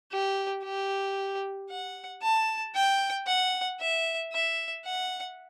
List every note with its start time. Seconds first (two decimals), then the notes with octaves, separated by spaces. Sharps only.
0.12 G4
0.64 G4
1.70 F#5
2.23 A5
2.75 G5
3.27 F#5
3.80 E5
4.33 E5
4.85 F#5